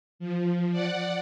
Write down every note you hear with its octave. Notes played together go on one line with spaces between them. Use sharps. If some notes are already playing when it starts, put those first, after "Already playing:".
F3
D5 F#5